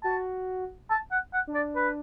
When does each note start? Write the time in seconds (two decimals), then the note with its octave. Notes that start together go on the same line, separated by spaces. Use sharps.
0.04 F#4 A5
0.90 A5
1.11 F#5
1.33 F#5
1.47 D4
1.54 D5
1.76 B4